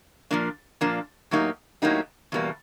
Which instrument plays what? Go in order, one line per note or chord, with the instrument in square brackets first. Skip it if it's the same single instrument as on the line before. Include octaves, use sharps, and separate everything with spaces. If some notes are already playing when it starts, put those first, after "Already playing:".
[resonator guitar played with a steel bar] A#2 F3 A#3 D4
A#2 F3 A#3 D4
A2 F#3 A#3 D#4 G4
A2 F#3 A#3 D#4 G4
E2 B2 G3 A#3